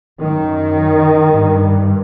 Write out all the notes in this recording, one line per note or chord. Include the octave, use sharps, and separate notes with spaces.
F#2 D#3
G2